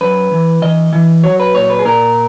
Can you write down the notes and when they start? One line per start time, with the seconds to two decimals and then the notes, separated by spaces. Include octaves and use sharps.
0.01 F#2 B4
0.32 E3
0.62 E3 D#5
0.93 E3
1.23 F#3 C#5
1.40 B4
1.55 A#2 C#5
1.70 B4
1.79 G#4
1.85 A#2 A#4